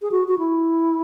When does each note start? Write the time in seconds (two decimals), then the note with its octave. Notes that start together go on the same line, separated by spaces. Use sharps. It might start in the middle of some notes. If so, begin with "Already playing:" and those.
0.02 G#4
0.11 F#4
0.28 F#4
0.39 E4